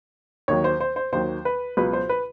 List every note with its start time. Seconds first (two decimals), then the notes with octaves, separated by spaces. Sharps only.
0.48 D#2 D#3 F#3 C#5
0.64 C5
0.80 C5
0.96 C5
1.12 D#2 D#3 F#3 C5
1.45 B4
1.77 C#2 B2 F#3 B4
1.93 C5
2.09 B4